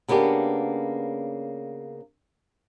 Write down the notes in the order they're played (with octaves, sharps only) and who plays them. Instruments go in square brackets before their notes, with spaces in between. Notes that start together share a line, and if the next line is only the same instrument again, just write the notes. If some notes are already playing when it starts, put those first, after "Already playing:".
[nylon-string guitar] C#3 A#3 B3 D4 G4